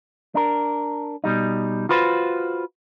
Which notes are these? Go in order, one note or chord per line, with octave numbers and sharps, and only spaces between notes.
D4 A#4
B2 G3 D#4
F4 F#4 B4 C5